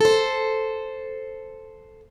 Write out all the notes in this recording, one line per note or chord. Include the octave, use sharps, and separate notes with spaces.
A4 C5